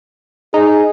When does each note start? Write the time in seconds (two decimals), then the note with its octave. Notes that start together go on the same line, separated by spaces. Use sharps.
0.54 D#4 G#4